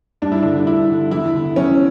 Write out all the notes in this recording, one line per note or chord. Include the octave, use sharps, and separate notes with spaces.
G2 D4
E4
D3 D4
G2 E4
D3
E2 E4
D3
E2 C#4